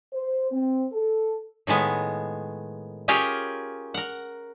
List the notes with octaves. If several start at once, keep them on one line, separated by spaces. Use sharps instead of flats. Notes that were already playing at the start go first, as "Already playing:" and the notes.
C5
C4
A4
A2 D#3 G#3 B3
C#4 F4 G4 G#4 A#4 C#5
A#4 F#5